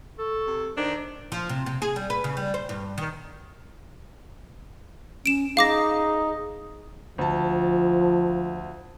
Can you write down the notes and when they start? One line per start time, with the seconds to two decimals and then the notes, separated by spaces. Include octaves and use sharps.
0.19 A4 C#6
0.47 C3
0.77 D#3 D4 C5
1.32 F3
1.49 C3
1.66 C3
1.82 G#4
1.96 G3
2.10 B4
2.24 C#3
2.37 G3
2.54 C5
2.69 G2
2.98 D#3
5.26 C#4 D7 E7
5.57 D#4 G#4 F5 D6 A#6
7.18 D2 F3 A5